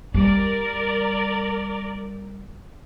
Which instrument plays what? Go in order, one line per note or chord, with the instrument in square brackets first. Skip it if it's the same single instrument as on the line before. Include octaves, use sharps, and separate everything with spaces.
[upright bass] G3 [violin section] A#4 D5